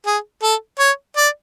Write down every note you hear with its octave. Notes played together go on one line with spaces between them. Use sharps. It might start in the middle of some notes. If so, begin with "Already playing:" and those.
G#4
A4
C#5
D5